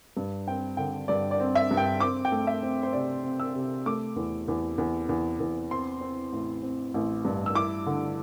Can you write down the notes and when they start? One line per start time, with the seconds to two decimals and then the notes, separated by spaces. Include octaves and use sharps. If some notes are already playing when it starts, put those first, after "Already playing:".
0.17 G2
0.47 C4 G5
0.77 D3 G5
1.08 G2 D5
1.31 D5
1.40 C4
1.55 E5
1.71 G2
1.77 G5
2.00 C4 D6
2.25 G5
2.32 A3
2.47 E5
2.63 C4
2.83 C5
2.93 C3 D5
3.24 C4
3.40 E6
3.55 C3
3.86 A3 D6
4.16 E2
4.48 E2
4.78 E2
5.09 E2
5.40 E2
5.71 C4 C6
6.01 C4
6.33 A1
6.63 C4
6.94 A1
7.25 G2
7.46 E6
7.55 E4 D6
7.86 D3